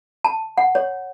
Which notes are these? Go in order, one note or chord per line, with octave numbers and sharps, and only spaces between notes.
A5
F#5
C#5